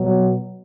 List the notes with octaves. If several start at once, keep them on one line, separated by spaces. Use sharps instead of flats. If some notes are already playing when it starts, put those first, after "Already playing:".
Already playing: B2 F#3